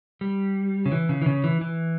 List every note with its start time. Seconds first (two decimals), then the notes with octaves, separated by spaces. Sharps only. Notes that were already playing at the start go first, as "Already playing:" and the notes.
0.21 G3
0.86 C#3
0.92 E3
1.09 C#3
1.22 E3
1.26 C#3
1.44 E3
1.61 E3